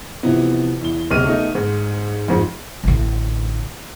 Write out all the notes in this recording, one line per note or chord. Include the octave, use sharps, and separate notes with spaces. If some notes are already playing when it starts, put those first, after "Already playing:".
C3 E3 F3 B3
E2 G7
D1 B1 C3 F6 D#7
A3 B3 D#4
G#2
F2 G#2 F3
A1 D3